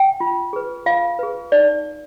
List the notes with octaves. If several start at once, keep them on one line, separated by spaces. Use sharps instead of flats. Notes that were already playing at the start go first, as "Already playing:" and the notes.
Already playing: G5
F4
G#4 B4
F4 F5
G#4 B4
D#4 D5